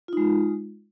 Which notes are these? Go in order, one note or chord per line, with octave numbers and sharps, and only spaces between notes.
G#3 D#4 F4